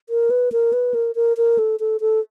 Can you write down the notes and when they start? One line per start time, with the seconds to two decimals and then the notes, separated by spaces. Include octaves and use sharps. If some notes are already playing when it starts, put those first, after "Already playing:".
0.09 A#4
0.30 B4
0.52 A#4
0.73 B4
0.94 A#4
1.15 A#4
1.37 A#4
1.58 A4
1.80 A4
2.01 A4